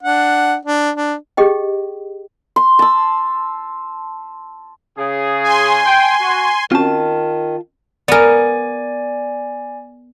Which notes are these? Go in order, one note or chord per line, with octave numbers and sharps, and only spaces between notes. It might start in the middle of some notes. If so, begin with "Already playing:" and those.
D4 F#5
D4
D4
G4 G#4 D#5 G5
C6
A5 E6
C#3 G#4
G#5 C6
G5
F#4
D#3 C4 C#4 F4 F#4 A5
B3 A#4 D5 G#5